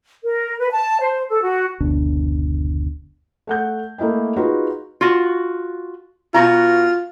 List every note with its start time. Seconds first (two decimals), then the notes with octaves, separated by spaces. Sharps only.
0.23 A#4
0.59 B4
0.71 A5
1.01 C5
1.29 A4
1.42 F#4
1.80 F#1 D2 B2 D4
3.47 A3 F#5 G6
3.98 A3 A#3 E4 D#5 G5
4.36 D#4 F4 F#4 G#4 B4
5.01 F4 F#4
6.34 B2 F4 F#4 A#5